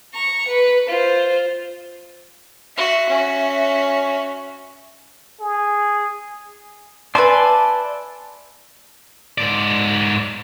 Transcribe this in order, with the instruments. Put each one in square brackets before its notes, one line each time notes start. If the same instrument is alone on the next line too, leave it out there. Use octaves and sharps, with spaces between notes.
[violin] A#5 C#6
B4
F4 C5
[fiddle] F#4 [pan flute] E5
[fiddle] C#4 F#4
[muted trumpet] G#4
[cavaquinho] B4 E5 G#5 [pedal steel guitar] D5 A5 C6
[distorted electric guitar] G#2 D5